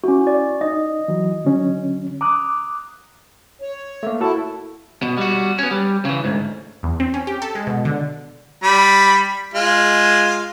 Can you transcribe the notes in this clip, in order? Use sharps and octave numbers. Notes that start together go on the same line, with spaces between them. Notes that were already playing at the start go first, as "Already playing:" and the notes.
C#4 E4 F#4
D5
D#4 D#5
E3 F#3
D3 F#3 C#4
A#5 D6 D#6 F#6
C#5
A3 A#3
E4 F#4 A4 A5
B2
G3 F#4
B3 C#4
G3
C#3 E3
D2 G#2
E2
C4
C#4
G4
A4
G#3
B2
D3
G3 B5
G#3 F4